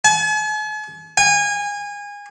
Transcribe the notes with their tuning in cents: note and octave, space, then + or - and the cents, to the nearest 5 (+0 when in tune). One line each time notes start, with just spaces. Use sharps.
G#5 +45
G#5 -25